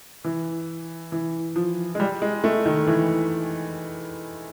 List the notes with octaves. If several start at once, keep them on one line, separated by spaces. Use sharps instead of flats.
E3
E3
F3
G#3
G3
G#3
A3
D#3
E3